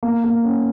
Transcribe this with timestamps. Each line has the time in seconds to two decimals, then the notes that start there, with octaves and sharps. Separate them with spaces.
0.03 A#3
0.24 A#3
0.44 C#4